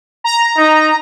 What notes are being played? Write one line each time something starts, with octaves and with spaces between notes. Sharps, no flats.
A#5
D#4